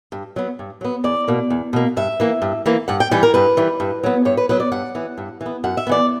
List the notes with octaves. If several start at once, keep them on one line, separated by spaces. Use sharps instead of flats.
G2
F#3 B3
G2
F#3 B3
E2 D5
B2 A#3
E2
B2 A#3
G2 E5
E3 A#3
G2
E3 A#3
G2 F#5
G5
E3 G3 G5
A#4
G2 B4
E3 G3
G2
F#3 B3
G2 C#5
B4
F#3 B3 B4
D5
G2 F#5
E3 B3
G2
E3
B3
F#2 F#5
E5
E3 B3 D5